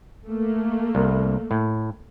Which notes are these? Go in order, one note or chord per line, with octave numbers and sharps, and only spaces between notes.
A3 A#3
C2
A2